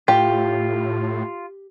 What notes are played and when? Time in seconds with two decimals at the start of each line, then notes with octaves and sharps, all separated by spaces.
0.08 A2 F4 G4